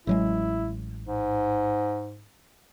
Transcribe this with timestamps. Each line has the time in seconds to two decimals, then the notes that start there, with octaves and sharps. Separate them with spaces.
0.07 A1 F#3 G#3 E4
1.03 G#2